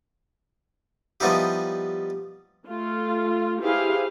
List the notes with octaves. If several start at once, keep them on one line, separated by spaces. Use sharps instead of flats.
F3 G3 B3 D#4 E4 G4
A3 F4
E4 G4 G#4 B4 C5 F5